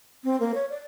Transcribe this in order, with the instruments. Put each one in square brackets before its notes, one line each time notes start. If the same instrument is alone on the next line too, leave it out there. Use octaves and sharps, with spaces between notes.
[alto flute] C4
A#3
C#5
D5